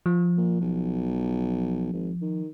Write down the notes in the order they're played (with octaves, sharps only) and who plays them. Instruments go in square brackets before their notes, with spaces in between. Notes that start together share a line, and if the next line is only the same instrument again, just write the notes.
[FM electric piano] F3
[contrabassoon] A#2
B1
G#1
D#3